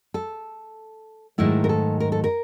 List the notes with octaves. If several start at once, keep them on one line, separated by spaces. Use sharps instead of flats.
A4
G#2 D#3 F#3 A3 E4
A#4
A4
A#4
A4
A#4